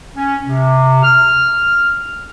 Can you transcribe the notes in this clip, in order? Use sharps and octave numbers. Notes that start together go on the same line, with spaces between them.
C#4
C3
F6